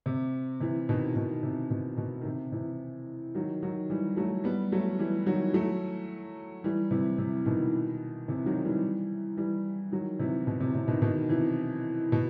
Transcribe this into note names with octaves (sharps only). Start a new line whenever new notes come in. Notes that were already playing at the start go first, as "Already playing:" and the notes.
C3
C3 E3
B2 D#3
B2 D#3
C3
B2
B2
D#3
C3
C3 E3
D#3 F#3
D#3 F#3
E3 G3
F#3 A3
G3 B3
F#3 A3
E3 G3
D#3 F#3
F#3 A3
E3 G3
C3 E3
C3
B2 D#3
C3 E3
D#3 F#3
E3 G3
E3 G3
D#3 F#3
C3 E3
B2
C3
C3
B2 D#3
B2 D#3
C3 E3
B2